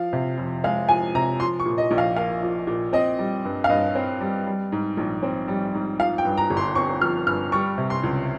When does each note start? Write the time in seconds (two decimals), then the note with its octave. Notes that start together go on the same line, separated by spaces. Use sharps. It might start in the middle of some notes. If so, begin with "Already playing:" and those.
Already playing: F3 F5
0.13 C3
0.38 F2
0.64 G#3 F5
0.89 F3 G#5
1.15 C3 A#5
1.40 F3 C6
1.60 C#6
1.66 A#2
1.78 D#5
1.91 A#1
1.98 F5
2.16 A#3 F5
2.43 F3
2.67 A#2
2.93 C4 D#5
3.19 G3
3.45 G2
3.64 F5
3.69 G2 D#5
3.95 C4
4.21 G3
4.47 G3
4.72 G#2
4.97 A#1
5.23 C4
5.48 G3
5.74 G#2
5.99 F3 F5
6.18 G5
6.25 G2
6.37 A#5
6.50 G1
6.57 C6
6.75 C4 C#6
7.01 F3 F6
7.27 G2 F6
7.52 G3 C#6
7.78 C3
7.90 C6
8.03 C#2